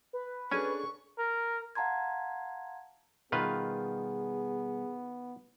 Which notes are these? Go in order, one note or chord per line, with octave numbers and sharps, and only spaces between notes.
B4
C#4 D4 G#4 A4 G#5 C#6
A#4
F5 F#5 A5 A#5 C6 G#6
B2 D#3 G3 B3 F4 G#4 B4